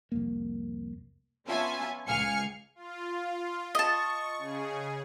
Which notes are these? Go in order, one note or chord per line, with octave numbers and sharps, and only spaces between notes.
C2 F2 A#3
B3 C#4 F4 E5 G#5 A5
C#2 F5 G#5 F6 C#7
F4
D#5 A5 C#6
C#3 G#4